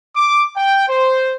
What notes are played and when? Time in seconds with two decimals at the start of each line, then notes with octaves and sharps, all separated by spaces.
0.16 D6
0.57 G5
0.88 C5